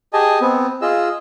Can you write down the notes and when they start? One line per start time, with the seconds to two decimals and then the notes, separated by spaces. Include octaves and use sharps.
0.13 G4 G#4 D#5 G#5 A5
0.41 B3 C4
0.82 F4 G#4 D#5 E6